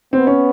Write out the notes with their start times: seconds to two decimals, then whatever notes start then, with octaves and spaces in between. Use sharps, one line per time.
0.13 B3 C4
0.27 C#4